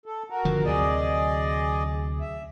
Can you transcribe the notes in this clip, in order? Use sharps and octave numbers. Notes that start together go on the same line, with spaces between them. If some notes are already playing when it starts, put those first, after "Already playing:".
A4
F#4 A#4
G1 D3 F3
D2 C3 F#3 G#4 D5 D#5
E5